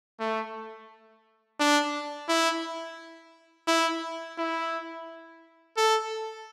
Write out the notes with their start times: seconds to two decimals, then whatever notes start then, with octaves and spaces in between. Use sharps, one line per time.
0.20 A3
1.59 D4
2.29 E4
3.68 E4
4.38 E4
5.77 A4